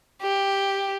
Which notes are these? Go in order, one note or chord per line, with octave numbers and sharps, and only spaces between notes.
G4